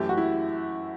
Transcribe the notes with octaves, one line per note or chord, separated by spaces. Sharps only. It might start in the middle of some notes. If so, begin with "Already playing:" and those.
Already playing: F#2 E3 A3 G4
F#4
E4